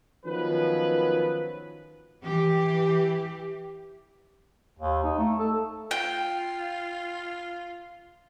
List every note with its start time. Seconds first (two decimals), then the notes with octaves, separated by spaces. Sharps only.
0.25 D#3 F3 F#3 B3 C#4 B4
2.23 E3 G4
4.79 D#2
5.04 D#4
5.18 A3
5.40 A4
5.91 F4 G5